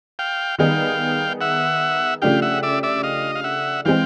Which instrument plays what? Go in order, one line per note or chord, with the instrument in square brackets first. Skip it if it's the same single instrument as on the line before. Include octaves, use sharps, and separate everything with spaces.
[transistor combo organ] F5 G5
[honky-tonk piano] D#3 G3 B3 D#4 G#4 [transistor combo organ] F5 G5
[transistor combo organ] E5 F#5
[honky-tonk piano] C#3 F3 A3 D4 G4 [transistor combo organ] F5 G5
[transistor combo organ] E5 F#5
D5 E5
D5 E5
D#5 F5
F5
E5 F#5
[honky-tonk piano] E3 G#3 C4 [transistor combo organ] F5 G5